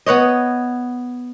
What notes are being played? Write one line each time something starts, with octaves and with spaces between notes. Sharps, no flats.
B3 B4 C#5 D#5